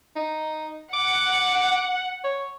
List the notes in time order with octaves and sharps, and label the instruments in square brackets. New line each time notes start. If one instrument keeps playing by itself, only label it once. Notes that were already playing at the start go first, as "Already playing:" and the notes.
[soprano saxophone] D#4
[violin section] F#5 [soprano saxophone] D6
[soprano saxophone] C#5